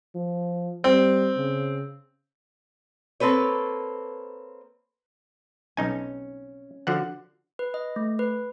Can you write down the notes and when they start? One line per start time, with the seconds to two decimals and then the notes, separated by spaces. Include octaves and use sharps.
0.15 F3
0.84 G3 C4
1.37 C#3
3.20 A#3 C4 A4 B4 C#5
5.77 B1 C#4 D#4 G#5
6.87 D3 F3 F#4 F#5
7.59 B4
7.74 D#5
7.96 A3
8.19 B4